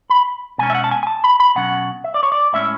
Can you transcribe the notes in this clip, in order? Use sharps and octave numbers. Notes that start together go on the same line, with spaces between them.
B5
B2 G#3 C#4 G#5
E5
F#5
A5
G#5
G#5
A5
B5
B5
B2 F#3 C#4 F#5
E5
D5
C#5
D5
A2 G#3 C#4 E5